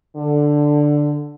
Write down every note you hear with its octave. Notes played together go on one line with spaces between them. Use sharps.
D3